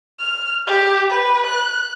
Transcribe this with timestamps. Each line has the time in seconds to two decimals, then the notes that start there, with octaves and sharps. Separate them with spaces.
0.19 F6
0.67 G4
1.09 B4
1.46 F#6